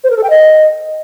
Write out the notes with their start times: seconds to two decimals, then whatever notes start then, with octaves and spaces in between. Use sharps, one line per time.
0.04 C5
0.10 A#4
0.17 A4
0.23 G5
0.30 D#5